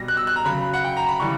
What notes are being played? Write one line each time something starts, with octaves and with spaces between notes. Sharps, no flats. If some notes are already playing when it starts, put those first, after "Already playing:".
Already playing: B2 G3 A#6
F#6
E6
F#6
A#5
C#3 F#3 B5
F#5
G5
A#5
B5
C#3 E3 G3 C#6